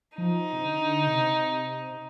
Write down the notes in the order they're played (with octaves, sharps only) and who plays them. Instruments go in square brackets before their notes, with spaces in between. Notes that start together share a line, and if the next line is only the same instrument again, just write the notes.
[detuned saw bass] F3 [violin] D#4
[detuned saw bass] C3
D3
C3